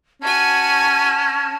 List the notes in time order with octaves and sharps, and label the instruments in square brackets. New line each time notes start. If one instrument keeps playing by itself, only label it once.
[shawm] C#4 [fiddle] F#4 G#5 [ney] A5